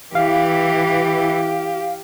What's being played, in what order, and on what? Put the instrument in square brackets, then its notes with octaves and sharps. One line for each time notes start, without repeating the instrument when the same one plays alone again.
[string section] E3 [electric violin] G4 [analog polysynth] F5